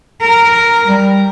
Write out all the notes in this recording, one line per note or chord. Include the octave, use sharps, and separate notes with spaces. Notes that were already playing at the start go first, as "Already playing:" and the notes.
A#4
G3